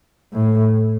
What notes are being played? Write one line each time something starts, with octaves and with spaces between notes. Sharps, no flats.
A2